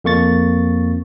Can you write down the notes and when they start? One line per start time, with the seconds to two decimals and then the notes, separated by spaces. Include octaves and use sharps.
0.04 F2 A#3 C#6 A6